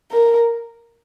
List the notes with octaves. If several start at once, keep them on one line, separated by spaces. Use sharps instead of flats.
A#4